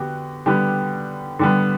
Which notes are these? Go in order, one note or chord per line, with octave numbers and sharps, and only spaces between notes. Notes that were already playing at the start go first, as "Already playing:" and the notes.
Already playing: D3 B3 F#4 G4
D3 G3 B3 G4
D3 G3 B3